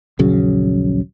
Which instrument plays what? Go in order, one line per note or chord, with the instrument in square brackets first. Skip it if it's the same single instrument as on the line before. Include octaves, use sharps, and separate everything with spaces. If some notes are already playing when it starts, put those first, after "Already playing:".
[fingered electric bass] D#1 A#1 C#3 F#3